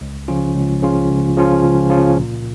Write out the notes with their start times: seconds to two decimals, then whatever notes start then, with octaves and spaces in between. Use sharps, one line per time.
0.01 C#2
0.28 C#3 F3 C#4 F4
0.55 C#2
0.82 C#3 F3 C#4 F4
1.09 C#2
1.36 C#3 F3 C#4 F4
1.63 C#2
1.90 C#3 F3 C#4 F4
2.17 A#2